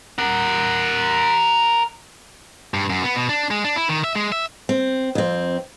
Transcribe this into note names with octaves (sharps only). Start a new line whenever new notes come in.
A#4 F#5
G2
F#2
B3
B2
D4
G#3
D4
E4
D#3
E5
G#3
E5
C4
F2 C4